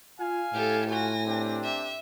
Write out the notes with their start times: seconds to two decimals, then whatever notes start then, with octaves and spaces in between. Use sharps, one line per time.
0.20 F4 F5 G#5
0.54 A2 G4 A4
0.90 F4 F#4 G#5 A#6
1.24 C4 D4 G4
1.63 E5